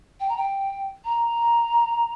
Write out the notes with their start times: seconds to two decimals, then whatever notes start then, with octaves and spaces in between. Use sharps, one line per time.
0.20 G5
0.29 A#5
0.36 G5
1.05 A#5